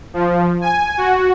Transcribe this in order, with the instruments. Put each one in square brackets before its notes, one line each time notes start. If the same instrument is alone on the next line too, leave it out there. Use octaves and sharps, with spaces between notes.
[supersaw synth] F3
G#5
F#4